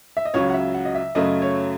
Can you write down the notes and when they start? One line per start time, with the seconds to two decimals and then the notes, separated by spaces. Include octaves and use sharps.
0.17 E5
0.25 D#5
0.34 C#2 C#3 F#3 C#5
0.49 F#5
0.54 E5
0.74 F#5
0.85 D#5
0.95 E5
1.15 F#2 C#3 F#3 A3 D#5
1.42 C#5